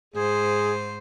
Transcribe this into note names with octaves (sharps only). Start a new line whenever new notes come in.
G#2 G#4 C5